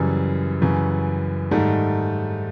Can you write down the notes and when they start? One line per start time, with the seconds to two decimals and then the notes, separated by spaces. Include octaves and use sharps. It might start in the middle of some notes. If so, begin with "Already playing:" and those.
Already playing: F#2 C#3 E3 G3
0.62 F#2 C#3 E3
1.51 G#2 D#3 G3 A3